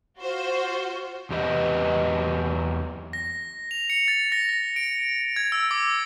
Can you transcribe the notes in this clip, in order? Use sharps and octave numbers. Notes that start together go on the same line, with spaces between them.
F4 F#4 C5
E2 G4 B4 D#5
A#6
F7
C#7
A6
A#6
A#6
D7
G#6
E6
D6